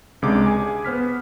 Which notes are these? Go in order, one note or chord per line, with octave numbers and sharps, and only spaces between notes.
C#2 C3 G#3 D4 D6
G#4 G#5
B3 C5 F6 B6